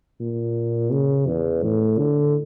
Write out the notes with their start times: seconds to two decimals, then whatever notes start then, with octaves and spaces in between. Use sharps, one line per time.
0.20 A#2
0.92 C#3
1.27 E2
1.63 A2
1.98 D3